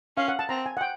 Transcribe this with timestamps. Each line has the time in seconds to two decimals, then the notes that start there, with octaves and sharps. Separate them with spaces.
0.17 C#4 F5
0.28 F#5
0.39 A5
0.49 C4 A#5
0.66 G#5
0.77 F#5
0.81 G5